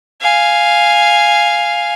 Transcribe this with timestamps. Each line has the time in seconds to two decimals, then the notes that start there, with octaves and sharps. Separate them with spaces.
0.22 F5 G#5